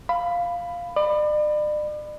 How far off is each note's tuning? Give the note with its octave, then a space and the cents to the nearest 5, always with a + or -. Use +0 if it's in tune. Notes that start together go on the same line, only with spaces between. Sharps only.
F5 +0 B5 +15
D5 +40 B5 +10